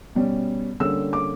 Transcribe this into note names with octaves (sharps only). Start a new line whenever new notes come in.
B2 G3 C#4
D3 G3 A#3 C#4 E6
D6